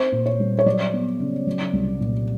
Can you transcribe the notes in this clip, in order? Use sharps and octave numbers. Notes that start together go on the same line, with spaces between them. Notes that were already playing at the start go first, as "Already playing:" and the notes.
Already playing: C4 C5
A#2
C#5
G3
C#5
F#3 D5
B3
C#3
F#3
C2
A#2